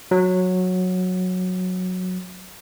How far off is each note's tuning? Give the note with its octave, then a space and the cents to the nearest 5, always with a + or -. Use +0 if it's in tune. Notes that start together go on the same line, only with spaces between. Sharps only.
F#3 -15